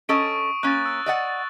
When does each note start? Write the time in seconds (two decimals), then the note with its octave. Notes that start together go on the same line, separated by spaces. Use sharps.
0.09 C#4 A4 D#5 C#6 D#6 D7
0.63 A#3 C#4 F#6 A6
0.86 E6
1.06 D5 D#5 F#5